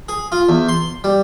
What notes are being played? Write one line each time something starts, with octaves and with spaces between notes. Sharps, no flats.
G#4
F4
E2
C6
G3